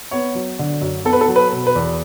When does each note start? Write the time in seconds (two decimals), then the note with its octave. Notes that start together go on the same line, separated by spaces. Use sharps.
0.11 B3 C#5
0.35 F#3
0.59 D3
0.81 F#2
1.05 B3 A4
1.13 B4
1.21 A4
1.28 F#3
1.36 B4
1.52 B2
1.67 B4
1.76 E2